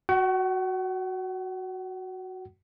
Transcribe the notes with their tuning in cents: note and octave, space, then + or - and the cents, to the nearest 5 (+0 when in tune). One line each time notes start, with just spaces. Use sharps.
F#4 +0 F#5 +40